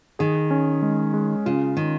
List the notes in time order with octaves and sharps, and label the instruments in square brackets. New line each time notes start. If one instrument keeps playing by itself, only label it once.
[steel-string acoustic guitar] D#3 [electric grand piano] G#4
[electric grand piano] C#4
G#3
G#3
[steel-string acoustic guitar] C#3 [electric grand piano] F4
[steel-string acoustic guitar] D#3 [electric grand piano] C#4